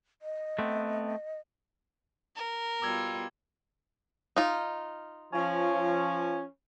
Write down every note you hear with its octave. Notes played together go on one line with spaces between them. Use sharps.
D#5
A3 B3 C4
A#4
B2 G3 F4 D6 E6 G#6
D#4 F4
F3 C#4